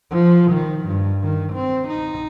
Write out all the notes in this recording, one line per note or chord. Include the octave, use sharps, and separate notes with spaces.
F3
D#3
G2
D#3
C4
D#4